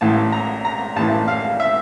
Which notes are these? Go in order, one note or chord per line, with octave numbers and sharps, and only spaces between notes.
A1 A2 E3 A5
A#5
A#5
A1 A2 E3 A5
F5
E5